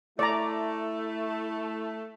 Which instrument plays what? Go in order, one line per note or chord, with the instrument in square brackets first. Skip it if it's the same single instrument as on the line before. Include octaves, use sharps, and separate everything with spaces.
[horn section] A3 [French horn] E4 [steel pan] D5 A#5